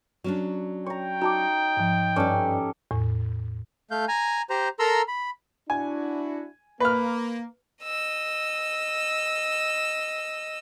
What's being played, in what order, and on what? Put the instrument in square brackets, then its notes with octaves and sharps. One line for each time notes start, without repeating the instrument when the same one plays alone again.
[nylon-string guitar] F#3 C#4 D4
[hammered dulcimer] C#5 A#5 [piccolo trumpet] G5
[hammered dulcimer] D#4 [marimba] F#4 A5 D6
[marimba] G#2 F3
[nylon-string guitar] G2 D5 [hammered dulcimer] C#4 G4 A4
[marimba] E2 A2
[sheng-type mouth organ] A3 F5 G6
G#5 A#5
G4 C5 A#5
A4 A#4 A#5 C6 E6
B5
[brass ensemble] D4 E4 F#4 [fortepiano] G#5
[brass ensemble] A#3 [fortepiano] B4 F6
[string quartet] D#5 E6